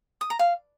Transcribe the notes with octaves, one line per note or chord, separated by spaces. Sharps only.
D#6
A#5
F5